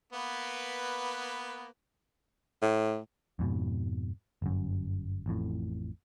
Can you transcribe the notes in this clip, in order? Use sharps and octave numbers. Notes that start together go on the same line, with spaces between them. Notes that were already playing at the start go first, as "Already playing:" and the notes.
A#3 B3 B4
A2
F2 G#2 B2
G1 F#2
A1 F2 A2